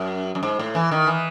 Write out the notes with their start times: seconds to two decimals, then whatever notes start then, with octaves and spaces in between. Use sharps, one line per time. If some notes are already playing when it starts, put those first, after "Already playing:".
Already playing: F#2
0.35 F#2
0.43 G#2
0.59 A2
0.75 E3
0.91 D#3
1.07 E3